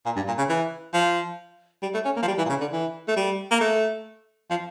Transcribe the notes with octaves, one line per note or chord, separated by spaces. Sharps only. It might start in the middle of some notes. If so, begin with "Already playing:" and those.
A#2
G2
A#2
C#3
E3
F3
G3
A3
C#4
A#3
F3
G3
E3
A#2
C#3
D3
E3
A3
G3
A#3
A3
F3